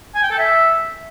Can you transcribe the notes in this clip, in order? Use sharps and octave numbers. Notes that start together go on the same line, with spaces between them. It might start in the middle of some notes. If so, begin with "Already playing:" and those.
G#5
G5
A4
E5